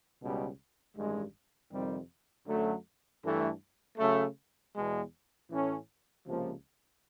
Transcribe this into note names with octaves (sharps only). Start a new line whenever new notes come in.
C#2 B2 G3
A1 G2 D#3 G#3
F2 C3 D#3 G3 C4
F#2 D3 F#3 A3
G2 E3 A3
C#3 F#3 A3
E2 B2 G#3
A2 E3 A3 C#4
C#2 C3 F3 A#3